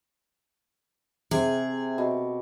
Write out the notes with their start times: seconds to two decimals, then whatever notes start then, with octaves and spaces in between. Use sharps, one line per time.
1.31 C3 G#4
1.98 B2